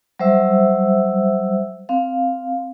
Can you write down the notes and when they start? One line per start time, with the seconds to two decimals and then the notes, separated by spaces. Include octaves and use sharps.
0.19 F#3 G3 C5 E5 E6
1.89 C4 F5